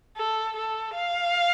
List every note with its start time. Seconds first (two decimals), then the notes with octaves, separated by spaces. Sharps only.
0.17 A4
0.56 A4
0.95 F5